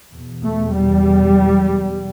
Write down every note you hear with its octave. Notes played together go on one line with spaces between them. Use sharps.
E2 B2
A3
G3